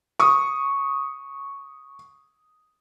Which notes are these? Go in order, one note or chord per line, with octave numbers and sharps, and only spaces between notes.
C#6 D#6